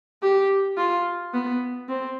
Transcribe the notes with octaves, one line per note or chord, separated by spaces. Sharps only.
G4
F4
B3
C4